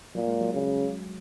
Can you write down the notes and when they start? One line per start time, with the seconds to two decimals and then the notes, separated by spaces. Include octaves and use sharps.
0.15 A#2 F#3
0.28 G#3
0.41 F#3
0.53 C#3